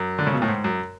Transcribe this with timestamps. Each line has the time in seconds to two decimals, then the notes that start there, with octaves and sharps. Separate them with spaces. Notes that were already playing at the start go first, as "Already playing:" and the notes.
Already playing: F#2
0.19 D3
0.27 C#3
0.33 B2
0.42 A2
0.48 G#2
0.64 F#2